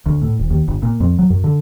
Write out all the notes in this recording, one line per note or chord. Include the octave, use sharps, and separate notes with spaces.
D2
A2
D#1
D#2
G1
A#2
F2
F#3
F#2
D3